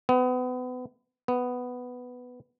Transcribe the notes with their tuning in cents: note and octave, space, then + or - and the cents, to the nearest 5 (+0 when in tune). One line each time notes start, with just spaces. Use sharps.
B3 +30
B3 +5